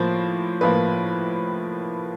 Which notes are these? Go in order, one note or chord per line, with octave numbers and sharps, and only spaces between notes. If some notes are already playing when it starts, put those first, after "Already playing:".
Already playing: A2 F3 A#3 C5
A2 F3 A#3 B4